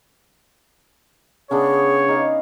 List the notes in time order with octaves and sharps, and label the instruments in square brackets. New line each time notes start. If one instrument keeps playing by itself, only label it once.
[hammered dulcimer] C#3 B3 D4 [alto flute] G#4 [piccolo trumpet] C#5
[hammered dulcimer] D#4 F5